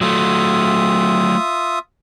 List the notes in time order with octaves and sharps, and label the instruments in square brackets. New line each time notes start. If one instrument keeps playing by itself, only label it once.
[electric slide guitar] F#3 A3 [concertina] F4 E5 D#6